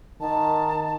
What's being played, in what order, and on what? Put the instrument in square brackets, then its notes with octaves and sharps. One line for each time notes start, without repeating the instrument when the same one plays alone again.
[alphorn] D#3 [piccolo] A5